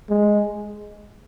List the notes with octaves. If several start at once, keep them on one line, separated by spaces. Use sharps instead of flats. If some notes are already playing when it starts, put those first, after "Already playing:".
G#3